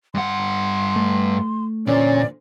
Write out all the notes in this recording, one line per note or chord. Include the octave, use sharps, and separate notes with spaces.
G2 F#5 C6
A3
E2 A#2 D3 C#4 C5 D5